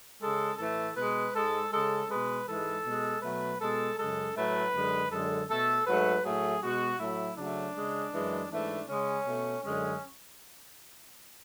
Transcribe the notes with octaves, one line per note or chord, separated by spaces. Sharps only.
C#3 G#3 A4
A2 E3 A3 A4
B2 G#3 B4
G#2 G#3 A4
C#3 G#3 A4
B2 G#3 B4
G#2 E3 G#3 A4
B2 G#3
B2 F#3 A3 B4
B2 G#3 A4
F#2 C#3 G#3 A4
A2 F#3 A3 B4
F#2 D3 G#3
F#2 D3 G#3 A4
B2 A3 A4
G#2 F#3 A3 B4
A2 F#3 A3 G#4
B2 G#3 F#4
A2 F#3 A3 E4
C#3 F#3 A3 D4
C#3 G#3
F#2 E3 G#3
G#2 E3 A3 D4
C#3 G#3 C#4
B2 A3
F#2 D3 G#3 C#4